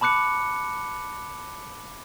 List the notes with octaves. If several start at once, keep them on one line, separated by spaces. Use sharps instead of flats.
A5 B5 D6 F#6 C#7